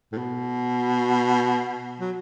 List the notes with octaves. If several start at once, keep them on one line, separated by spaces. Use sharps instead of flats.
A2
B2
F#3